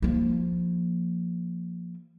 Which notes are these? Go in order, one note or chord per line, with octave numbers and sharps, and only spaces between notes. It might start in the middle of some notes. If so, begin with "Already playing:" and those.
F3 A#3